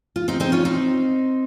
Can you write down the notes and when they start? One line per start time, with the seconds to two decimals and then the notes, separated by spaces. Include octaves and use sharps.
0.16 F4
0.28 C4 D#4
0.40 C4 D#4
0.52 C#4 F4
0.65 C4 D#4